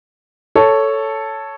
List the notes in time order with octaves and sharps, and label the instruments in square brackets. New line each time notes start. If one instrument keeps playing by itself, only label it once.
[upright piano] A4 C#5